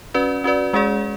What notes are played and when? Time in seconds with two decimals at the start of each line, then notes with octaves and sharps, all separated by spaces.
0.14 C#4 F#4 B4 D5
0.44 C#4 F#4 B4 D5
0.73 G#3 C#4 G#4 D5